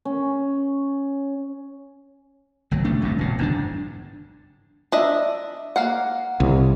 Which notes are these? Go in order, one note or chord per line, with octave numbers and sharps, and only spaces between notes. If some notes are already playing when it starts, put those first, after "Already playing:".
C#4
G1 C2 F#3
A1 A3 D4
G1 C2 F#2 A#2
E1 A#2
F#1 G#2 C#3 D4
D4 D#5 E5
A#3 F5 F#5
C2